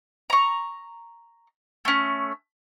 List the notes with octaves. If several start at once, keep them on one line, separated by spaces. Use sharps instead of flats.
A#5 C#6
A3 C#4